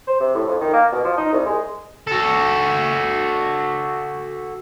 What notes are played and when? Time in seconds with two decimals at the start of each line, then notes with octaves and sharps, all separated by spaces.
0.07 C5
0.20 C3
0.35 A2
0.48 F2
0.61 D#3
0.73 A#3
0.92 B2
1.05 F3
1.18 D#4
1.33 C2
1.46 G#3
2.07 F#4 A4